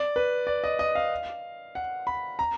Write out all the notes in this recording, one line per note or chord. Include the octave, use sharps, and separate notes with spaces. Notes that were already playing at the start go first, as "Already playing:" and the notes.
Already playing: D5
B4
D5
D#5
D#5
F5
F#5
B5
A#5